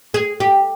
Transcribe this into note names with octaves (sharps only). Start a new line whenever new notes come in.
G#4
G4